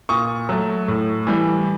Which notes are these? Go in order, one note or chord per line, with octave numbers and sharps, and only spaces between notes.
A#2 C#6 D#6
F#3 A3
A2
E3 G3